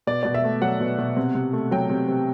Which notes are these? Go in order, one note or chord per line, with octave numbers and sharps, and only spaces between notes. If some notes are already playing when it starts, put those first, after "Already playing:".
B2 D5
B2 D5
E5
A3
F#3 F#5
B2
B2
C3
C3
A3
F#3 G5
C3
C3